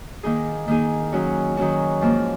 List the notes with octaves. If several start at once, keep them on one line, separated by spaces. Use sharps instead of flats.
D#3 A#3 D#4 G#4
D#3 A#3 D#4 G#4
D#3 F#3 C#4 F#4
D#3 F#3 C#4 F#4
G#2 F3 A#3